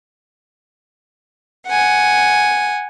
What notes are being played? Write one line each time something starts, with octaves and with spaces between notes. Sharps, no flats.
F#5 G#5